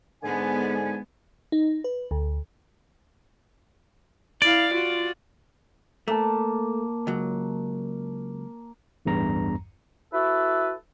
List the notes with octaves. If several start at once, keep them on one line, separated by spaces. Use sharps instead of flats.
G#2 D3 G#3 B3 G#5
D#4
B4
D2
E4 D5 F5
F4 F#4
A3 A#3 A5
C#2 F#3
A1 E2 G2 A#5
E4 F#4 A4 B4